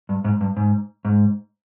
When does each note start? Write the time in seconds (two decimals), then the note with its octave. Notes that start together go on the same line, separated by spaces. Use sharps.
0.09 G2
0.24 G#2
0.41 G2
0.56 G#2
1.05 G#2